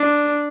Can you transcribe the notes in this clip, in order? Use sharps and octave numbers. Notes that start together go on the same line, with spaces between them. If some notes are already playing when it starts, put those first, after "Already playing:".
Already playing: D4